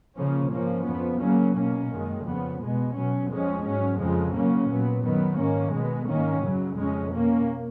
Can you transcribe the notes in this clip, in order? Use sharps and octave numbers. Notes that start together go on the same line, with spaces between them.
C#3 F3 A#3 C#4
G#2 F3 A#3 C#4
F2 F3 B3
C#3 F#3 A#3 C#4
B2 A#3 C#4
F#2 D#3 G#3
F2 C#3 F3 B3
B2 G#3 B3
B2 F#3 C#4
F2 F3 G#3 C#4
G#2 F#3 C#4
F2 C#3 F3 G#3
C#3 F#3 A#3 C#4
A#2 F#3 B3
F#2 D#3 F#3 B3
G#2 D#3 A#3 C#4
B2 G#3 B3
G#2 D#3 A#3 C#4
F#2 C#3 F#3
F2 C#3 G#3 C#4
B2 A#3 C#4